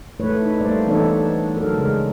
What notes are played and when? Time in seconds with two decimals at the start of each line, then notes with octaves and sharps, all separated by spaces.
0.20 A3 E4 B4 C#5
0.42 D#4
0.60 G3 A3 A#3 C5 D5
0.86 E3 B3 D4 D#4 A4 C#5
1.57 F#3 D#4 A4 A#4
1.72 C#3 G#3 A#4